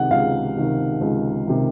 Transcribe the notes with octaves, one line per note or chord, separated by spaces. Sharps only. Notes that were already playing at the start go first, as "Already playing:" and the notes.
Already playing: C#2 C3 D#3 F#5
C#2 F5
C3 D#3
C#2
C3 D#3